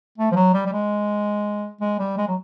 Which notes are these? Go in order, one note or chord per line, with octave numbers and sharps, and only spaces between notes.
A3
F3
F#3
G3
G3
G#3
G#3
G3
G#3
F#3